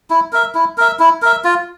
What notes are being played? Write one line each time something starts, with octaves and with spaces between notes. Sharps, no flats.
E4
A#4 E5
E4
A#4 E5
E4
A#4 E5
F4